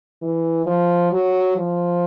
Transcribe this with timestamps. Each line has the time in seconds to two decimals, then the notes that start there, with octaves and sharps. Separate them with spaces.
0.22 E3
0.66 F3
1.12 F#3
1.57 F3